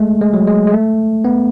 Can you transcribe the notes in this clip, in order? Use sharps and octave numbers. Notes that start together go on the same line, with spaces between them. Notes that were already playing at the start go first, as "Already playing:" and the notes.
Already playing: G#3 A3
G#3
F#3
G#3
G#3
A3
B3